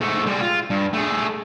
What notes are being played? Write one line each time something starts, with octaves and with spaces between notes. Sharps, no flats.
G#2 A3
G3 G#3
F4
G2
A3 G#4